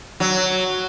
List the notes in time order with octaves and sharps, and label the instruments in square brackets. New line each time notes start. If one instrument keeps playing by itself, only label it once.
[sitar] F#3